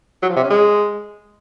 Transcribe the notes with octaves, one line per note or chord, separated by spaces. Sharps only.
F#3
F3
C3
C#4
G#3